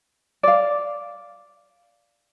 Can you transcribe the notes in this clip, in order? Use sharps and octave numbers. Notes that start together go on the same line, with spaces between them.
D5 F5